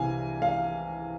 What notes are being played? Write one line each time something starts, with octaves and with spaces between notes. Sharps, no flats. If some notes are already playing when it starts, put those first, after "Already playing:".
Already playing: C2 C3 E3 F5 G#5
F5